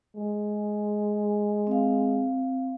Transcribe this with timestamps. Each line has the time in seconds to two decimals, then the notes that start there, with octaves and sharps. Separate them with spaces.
0.16 G#3
1.67 C4 F5